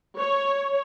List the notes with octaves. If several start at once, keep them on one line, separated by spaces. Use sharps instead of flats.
C#5